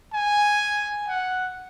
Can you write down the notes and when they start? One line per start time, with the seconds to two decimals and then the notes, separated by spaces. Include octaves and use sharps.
0.14 G#5
1.08 F#5